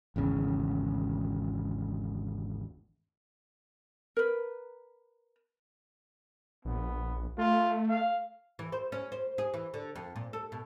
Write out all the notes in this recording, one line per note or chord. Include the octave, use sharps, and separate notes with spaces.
G#1 E2 C#3
A#4 B4
A#1 B3
A3 F4
F5
E3
C5
C#4
C5
G#4
E3
D3
F2
A#2
A4
B2